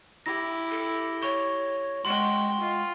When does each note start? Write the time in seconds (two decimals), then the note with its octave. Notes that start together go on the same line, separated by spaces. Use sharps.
0.26 E4 G4 A#6
0.71 A4
1.23 C#5 C#6
2.05 G#3 F#4 G5 C6
2.60 F4